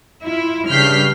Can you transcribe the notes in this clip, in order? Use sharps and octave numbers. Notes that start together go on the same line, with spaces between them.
E4 F4
G2 C#3 F6 G6 B6 C7